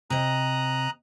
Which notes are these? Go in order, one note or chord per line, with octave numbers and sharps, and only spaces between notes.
C3 D#5 A#5 D#6 F#6